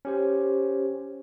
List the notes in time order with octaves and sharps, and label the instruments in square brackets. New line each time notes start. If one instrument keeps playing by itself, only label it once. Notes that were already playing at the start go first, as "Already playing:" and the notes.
[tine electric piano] C#4 G4 C5